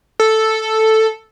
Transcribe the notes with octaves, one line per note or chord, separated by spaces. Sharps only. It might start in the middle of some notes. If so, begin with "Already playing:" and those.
A4